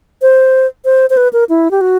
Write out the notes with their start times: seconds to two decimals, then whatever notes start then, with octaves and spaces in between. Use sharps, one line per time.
0.22 C5
0.85 C5
1.10 C5
1.17 B4
1.33 A#4
1.49 E4
1.71 G4
1.81 F#4